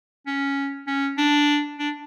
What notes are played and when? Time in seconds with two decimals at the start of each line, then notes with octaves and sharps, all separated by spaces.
0.27 C#4
0.87 C#4
1.18 D4
1.79 D4